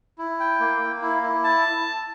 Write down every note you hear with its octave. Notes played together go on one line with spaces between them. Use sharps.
E4
G5
A#3
A#3
E4
E4
A5